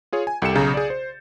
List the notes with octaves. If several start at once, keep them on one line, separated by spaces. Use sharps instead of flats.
F4 G#4 C#5
G#5
C2 G4 A4 C#7 E7
B1 C#3 G#4 A#5 G6 A6
G#4 D5
C5